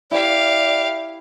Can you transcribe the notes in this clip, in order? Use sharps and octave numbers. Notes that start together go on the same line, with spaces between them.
E4 G4 D5 F5